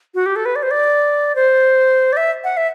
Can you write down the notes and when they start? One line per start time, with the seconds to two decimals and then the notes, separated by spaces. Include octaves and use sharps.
0.15 F#4
0.26 G4
0.36 A4
0.45 B4
0.56 D5
0.63 C5
0.71 D5
1.35 C5
2.13 D5
2.17 E5
2.44 F#5
2.57 E5